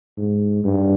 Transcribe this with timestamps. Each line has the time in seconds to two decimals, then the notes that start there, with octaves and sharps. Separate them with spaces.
0.18 G#2
0.64 G2